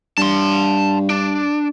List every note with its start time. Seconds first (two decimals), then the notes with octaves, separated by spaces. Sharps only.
0.18 G2 A5 C6
1.10 D4